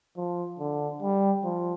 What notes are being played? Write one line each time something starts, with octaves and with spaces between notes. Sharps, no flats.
F3
D3
G3
F3